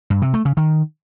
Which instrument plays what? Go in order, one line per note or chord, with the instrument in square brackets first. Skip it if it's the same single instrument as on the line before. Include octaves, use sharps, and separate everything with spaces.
[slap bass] G2
C3
A3
C#3
D#3